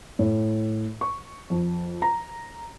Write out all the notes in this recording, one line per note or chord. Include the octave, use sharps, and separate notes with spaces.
A2
C#6
F2
A#5